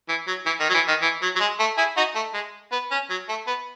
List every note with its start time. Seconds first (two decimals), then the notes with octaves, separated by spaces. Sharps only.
0.09 E3
0.27 F#3
0.46 E3
0.60 D#3
0.70 F#3
0.74 E3
0.88 D#3
1.02 E3
1.22 F#3
1.36 F#3
1.40 G#3
1.60 A3
1.77 E4 G#4
1.97 D#4 F#4
2.15 A3
2.34 G#3
2.72 B3
2.91 C#4
3.10 F#3
3.29 A3
3.47 B3